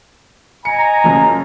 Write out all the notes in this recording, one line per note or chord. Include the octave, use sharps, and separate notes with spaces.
D#5 G#5 A#5 C#7
F#2 C#3 F3